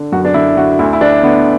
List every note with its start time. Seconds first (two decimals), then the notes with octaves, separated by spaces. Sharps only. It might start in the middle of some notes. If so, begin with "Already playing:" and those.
Already playing: D3
0.12 F#2 F#4
0.25 D4
0.34 D3 E4
0.57 D3 F#4
0.79 D2 E4
0.93 E4
1.01 D3 D4
1.23 D3 B3